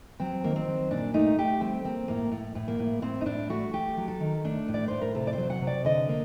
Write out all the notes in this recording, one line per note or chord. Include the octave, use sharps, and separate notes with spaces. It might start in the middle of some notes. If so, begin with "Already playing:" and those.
F#3 C4
D#3 A#3
C4
F#3
A#2 D4
A3 D#4
A3 G4
G3 C4
A#3 C4
A2 A#3
A2
A2
A#3
A2
A2 C4
D#4
A2 D4
A3 F#4
A3 G4
F#3
A4
D#3
A3 D4
A2
D5
A2 C5
A#4
C3 A4
D5
F#3 C5
F#5
C3
D5
D3 D#5
A#3